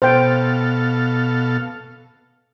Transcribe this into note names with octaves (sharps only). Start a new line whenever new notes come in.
B2 A4 C5 F5 G5